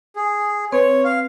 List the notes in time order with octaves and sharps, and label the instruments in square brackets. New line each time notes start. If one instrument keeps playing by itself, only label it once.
[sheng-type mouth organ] G#4
[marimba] C4 B4 [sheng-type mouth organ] C#5
[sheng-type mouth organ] F5